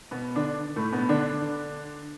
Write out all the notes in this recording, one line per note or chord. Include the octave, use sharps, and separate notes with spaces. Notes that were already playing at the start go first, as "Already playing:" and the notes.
B2 B3
D3 D4
A2 A3
B2 B3
D3 D4